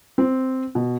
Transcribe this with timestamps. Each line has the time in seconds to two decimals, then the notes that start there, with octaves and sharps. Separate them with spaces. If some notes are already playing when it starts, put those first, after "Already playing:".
0.18 C4
0.75 B2